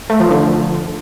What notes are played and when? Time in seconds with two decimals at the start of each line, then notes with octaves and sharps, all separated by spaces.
0.10 A3
0.20 F3
0.31 D3